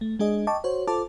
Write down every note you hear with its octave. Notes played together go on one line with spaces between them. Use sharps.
A3
G#3 D4 G#4 D#5
D#5 G5 A5 C#6 D6
F#4 C5 C#5
F4 A4 C5 A5 D6